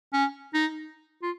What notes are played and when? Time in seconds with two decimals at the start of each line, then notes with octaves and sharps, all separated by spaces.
0.13 C#4
0.54 D#4
1.22 F4